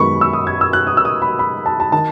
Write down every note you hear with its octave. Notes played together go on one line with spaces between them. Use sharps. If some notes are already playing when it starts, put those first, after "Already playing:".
Already playing: F#2 D#3 G#3 B3 B5 C#6
E6
D#6
G#6
E6
F#6
D#6
E6
D#6
B5
B5
A5
A5
D#3 A5